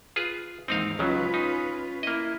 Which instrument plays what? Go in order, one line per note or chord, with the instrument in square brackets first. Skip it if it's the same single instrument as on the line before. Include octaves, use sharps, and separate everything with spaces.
[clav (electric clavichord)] F4 G#4 B4
[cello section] D#2 G#2 E3 [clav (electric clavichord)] C4 D#4 F5
[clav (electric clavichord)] C#2 C#3 F#3 [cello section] C#4 F4 B4
[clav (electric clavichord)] D#4
[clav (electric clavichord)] A#3 D#5 [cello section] E4